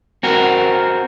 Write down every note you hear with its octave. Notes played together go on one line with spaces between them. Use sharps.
C4 F#4 A#4